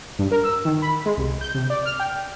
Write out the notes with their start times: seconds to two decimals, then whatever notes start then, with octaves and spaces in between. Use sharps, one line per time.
0.19 G2
0.31 A#4
0.44 E6
0.65 D#3
0.82 B5
1.06 G#3
1.17 C2
1.41 G6
1.55 C3
1.70 D5
1.85 F6
2.00 G5